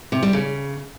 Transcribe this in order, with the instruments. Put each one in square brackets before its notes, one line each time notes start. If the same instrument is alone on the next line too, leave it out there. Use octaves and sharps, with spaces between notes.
[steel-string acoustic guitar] C3
G3
C#3